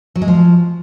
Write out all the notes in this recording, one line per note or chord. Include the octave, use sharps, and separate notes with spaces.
F#3
G#3
F3